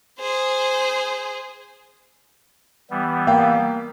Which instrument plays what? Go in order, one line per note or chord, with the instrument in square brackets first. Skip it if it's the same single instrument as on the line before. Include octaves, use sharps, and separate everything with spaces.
[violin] G#4 C5
[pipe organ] E3 G3 B3
[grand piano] A#3 F5 G5